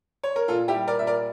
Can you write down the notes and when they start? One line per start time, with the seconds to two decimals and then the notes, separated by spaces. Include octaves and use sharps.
0.23 C#5
0.36 A#4
0.48 A#2 F4 A4
0.68 E4 G4
0.75 G3
0.87 A#4 D5
0.99 A#2 E5
1.07 A#4 D5